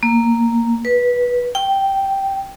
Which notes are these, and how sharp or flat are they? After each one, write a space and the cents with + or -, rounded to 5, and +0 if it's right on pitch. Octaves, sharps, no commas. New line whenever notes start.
A#3 -5
B4 -15
G5 -5